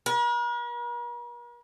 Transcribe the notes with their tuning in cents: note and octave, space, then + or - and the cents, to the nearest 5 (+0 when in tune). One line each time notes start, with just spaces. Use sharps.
A#4 +45